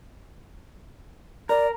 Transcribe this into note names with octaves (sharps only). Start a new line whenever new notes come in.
A#4 D5